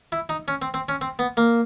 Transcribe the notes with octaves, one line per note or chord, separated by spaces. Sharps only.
E4
D#4
C#4
C4
C4
C#4
C4
B3
A#3